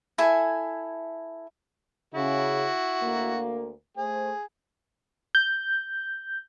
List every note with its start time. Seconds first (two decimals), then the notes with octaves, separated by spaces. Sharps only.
0.18 E4 A4 G#5
2.14 C#3 E4 F#4
3.03 D2 A#3
3.97 A3 G#4 C5
5.35 G6